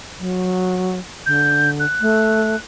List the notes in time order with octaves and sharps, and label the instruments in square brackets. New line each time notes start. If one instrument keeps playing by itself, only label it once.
[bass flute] F#3
[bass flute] D3 [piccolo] G6
[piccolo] F#6
[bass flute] A3